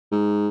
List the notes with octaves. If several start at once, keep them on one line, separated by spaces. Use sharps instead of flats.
G#2